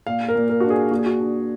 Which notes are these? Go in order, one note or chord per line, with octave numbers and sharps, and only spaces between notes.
A#2 F5
A#4
A#2
A#4
D4 F#4
G#4
A#2 F#4
G#4
F#4
D4